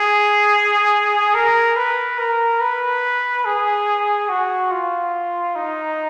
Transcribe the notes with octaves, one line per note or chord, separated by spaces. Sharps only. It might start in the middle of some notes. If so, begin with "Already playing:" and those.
Already playing: G#4
A#4
B4
A#4
B4
G#4
F#4
F4
D#4